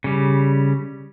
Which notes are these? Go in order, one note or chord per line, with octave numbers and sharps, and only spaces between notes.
C#3 G3